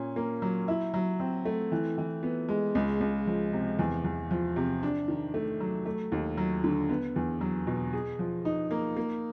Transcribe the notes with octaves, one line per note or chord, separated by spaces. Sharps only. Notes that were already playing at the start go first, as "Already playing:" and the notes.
Already playing: A#2 C#4
A#3
F#3
E4
F#3
C4
A3
E3
E3
B3
G#3
C#2
C#2
F3
C3
E2
E2
F3
C3
D4
D#3
A3
F#3
A3
D#2
F#3
D3
B3
E2
F#3
B2
G#4
F3
D#4
A#3
A#3